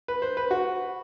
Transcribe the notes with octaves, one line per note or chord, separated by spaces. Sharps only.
B4
C5
B4
F#4